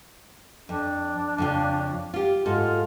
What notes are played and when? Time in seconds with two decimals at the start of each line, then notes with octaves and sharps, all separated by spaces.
0.69 F2 D4
1.38 F2 C#3 F4
2.14 F4 G4
2.46 G#2 F4 F#4 A4